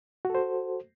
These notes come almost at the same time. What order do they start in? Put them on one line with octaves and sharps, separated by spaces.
F#4 A4 C5